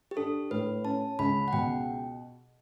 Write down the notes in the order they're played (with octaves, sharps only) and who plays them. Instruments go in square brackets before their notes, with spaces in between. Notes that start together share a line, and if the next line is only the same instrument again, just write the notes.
[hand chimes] G4
[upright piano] D4 [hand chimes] A4
[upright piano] A2 [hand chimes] B4
[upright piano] C#4 [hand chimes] A5
[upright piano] C#2 [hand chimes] B5
[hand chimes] F#5
[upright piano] B2 [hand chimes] G5